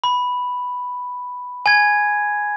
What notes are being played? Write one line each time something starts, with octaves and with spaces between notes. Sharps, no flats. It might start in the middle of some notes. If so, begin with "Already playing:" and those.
B5
G#5 G#6